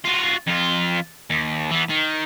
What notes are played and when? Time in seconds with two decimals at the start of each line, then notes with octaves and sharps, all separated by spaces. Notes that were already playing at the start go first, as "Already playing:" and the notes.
0.05 F4 F#4
0.47 F2 F4
1.30 D#2
1.71 E3 B3
1.89 D#3